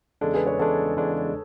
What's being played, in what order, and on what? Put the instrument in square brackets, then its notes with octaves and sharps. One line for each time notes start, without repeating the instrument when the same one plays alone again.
[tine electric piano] E2 C#3 G#3 D4 [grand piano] A4
[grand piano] G#4 B4
A4 C#5
[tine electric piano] E2 C#3 G#3 D4 [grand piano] A4 C#5
[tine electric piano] E2 C#3 G#3 D4